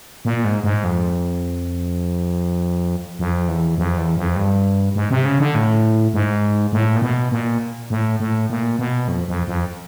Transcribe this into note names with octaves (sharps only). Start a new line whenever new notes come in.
A#2
G#2
G#2
F2
F2
E2
F2
E2
F2
G2
G#2
C3
C#3
D3
A2
G#2
A2
A#2
B2
A#2
A2
A2
A#2
B2
F2
F2
F2